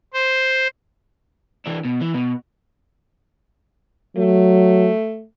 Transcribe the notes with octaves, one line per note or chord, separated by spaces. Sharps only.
C5
E3 D4
B2
E3
B2
F#3 A3